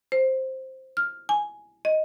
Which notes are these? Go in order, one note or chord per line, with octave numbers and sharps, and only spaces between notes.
C5
F6
G#5
D#5